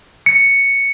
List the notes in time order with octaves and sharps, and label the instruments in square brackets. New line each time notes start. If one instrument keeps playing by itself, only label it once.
[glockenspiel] C#7